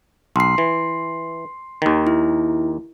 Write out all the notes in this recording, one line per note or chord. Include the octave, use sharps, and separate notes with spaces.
B1 C6 C7
E3
D#2 D#3
E4